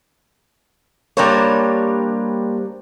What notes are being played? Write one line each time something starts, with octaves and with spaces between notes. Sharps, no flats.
G3 A#3 D4 C5 C#5 A#5